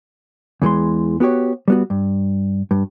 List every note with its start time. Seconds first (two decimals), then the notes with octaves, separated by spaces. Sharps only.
0.62 E2 E3 G#3 C6
1.20 B3 F#4 G4 C#5
1.68 G3 B3 F#4
1.90 G2
2.71 G2